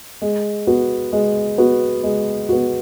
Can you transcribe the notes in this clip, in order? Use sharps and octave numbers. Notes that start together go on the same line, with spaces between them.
G#3
B3 F#4
G#3
B3 F#4
G#3
B3 F#4